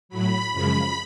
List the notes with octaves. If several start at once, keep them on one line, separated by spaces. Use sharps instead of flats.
A2 F#3 B5
F#2 C#3 F3 G#3 B5